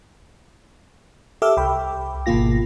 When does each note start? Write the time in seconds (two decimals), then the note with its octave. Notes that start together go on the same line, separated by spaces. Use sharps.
1.42 G4 A4 E5 D6 E6 F6
1.57 C2 G5 B5 D6
2.26 G#1 B2 D#3 A#3 F4 A#6